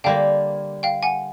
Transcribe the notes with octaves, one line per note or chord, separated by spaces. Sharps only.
D3 G3 A#3 F5 G5
F5 G5
F#5 G#5